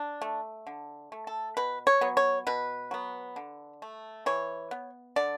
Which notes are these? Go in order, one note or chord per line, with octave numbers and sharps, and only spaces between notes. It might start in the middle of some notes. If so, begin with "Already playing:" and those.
Already playing: D4
A3
D3
A3
A4
B2 B4
C#5
F#3 B3
C#5
B2 B4
F#3 B3
D3
A3
E3 C#5
B3
D3 D5